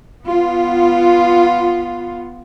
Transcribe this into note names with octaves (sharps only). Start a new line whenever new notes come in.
B3 F4